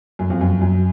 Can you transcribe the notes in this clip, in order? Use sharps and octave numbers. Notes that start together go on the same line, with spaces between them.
F#2
F2
F#2
F#2